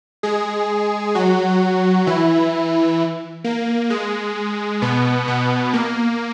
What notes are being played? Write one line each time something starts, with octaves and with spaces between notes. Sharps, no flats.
G#3 G#4
F#3 F#4
E3 E4
A#3
G#3
B2 B3
B2 B3
A#3